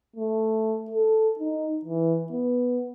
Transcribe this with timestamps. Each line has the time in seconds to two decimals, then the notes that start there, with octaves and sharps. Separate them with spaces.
0.16 A3
0.90 A4
1.39 D#4
1.85 E3
2.32 B3